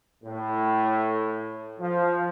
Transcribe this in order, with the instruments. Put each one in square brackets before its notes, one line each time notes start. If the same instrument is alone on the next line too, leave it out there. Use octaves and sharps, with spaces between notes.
[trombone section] A2
F3